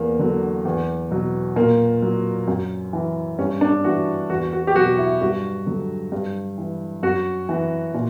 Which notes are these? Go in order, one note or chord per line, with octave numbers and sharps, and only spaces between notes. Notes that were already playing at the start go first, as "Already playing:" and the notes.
Already playing: E2 A#3
D3 F#3
E2
B2 F#3
A#2 A#3
F#3
F#2
E3
G2 C#4
D4
E3 F#4
E2 F#4
F#4
G4
B2 F#3 F#4
E4
G2 F#4
D3 F#3
G2
E3
F#2 F#4
E3
A#2